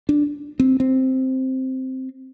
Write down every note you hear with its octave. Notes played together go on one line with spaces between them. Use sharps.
D4
C4
C4